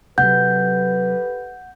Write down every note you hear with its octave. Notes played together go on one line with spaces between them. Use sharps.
C3 F#3 G4 A4 B4 F#5 G6